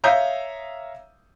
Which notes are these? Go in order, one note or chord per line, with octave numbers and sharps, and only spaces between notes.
C#5 E5 F5 A#5 D#6 G6